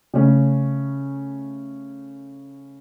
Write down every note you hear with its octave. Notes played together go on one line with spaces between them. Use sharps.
C#3 A3 C#4